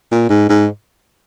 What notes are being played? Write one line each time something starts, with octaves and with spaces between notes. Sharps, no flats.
A#2
G#2
G#2